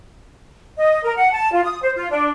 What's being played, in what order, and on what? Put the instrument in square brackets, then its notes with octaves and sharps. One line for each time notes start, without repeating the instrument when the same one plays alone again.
[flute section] D#5
A#4
F#5
A5
F4
D#6
C5
F4
D4